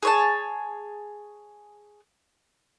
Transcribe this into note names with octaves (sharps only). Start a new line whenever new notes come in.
G#4 C#5 A5